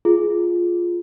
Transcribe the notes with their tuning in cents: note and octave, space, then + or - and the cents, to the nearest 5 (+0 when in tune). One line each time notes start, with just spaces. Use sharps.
F4 +0 G#4 +15